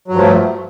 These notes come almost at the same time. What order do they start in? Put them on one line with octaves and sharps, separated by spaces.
F#3 G2 F3 A3